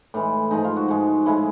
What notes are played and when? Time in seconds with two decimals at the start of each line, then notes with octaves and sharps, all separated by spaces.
0.14 A2 E3 G#3
0.51 G#2 F3 G#3 D#4
0.64 F4
0.76 F#4
0.88 G#2 F3 G#3
1.26 A2 F3 G#3 E4